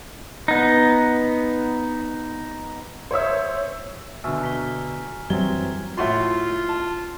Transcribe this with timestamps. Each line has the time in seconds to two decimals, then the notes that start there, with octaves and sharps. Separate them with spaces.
0.48 B3 D#4
3.11 C5 C#5 E5 E6
4.24 B2 D3 E5 G#5 C#6 F6
4.41 A#5 B6 G7
5.30 F#2 E3 F#3 G3 C4 G#6 A6 G7
5.97 A2 F4 F#4 C6
6.69 A5